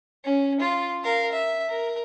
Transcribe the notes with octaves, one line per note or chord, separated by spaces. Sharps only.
C#4
F4
A#4 F5
E5
A#4